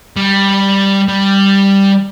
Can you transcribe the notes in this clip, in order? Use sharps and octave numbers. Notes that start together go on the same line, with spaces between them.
G3
G3